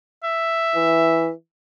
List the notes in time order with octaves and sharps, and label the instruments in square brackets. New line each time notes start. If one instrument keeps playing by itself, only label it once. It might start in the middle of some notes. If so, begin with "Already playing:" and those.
[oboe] E5
[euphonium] E3